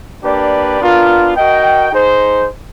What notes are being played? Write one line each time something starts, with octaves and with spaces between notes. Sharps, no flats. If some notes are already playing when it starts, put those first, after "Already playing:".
A#3 D4 G4 B4 D5
B3 D4 F4 A#4
F#4 A#4 D#5 G5
D#4 G#4 C5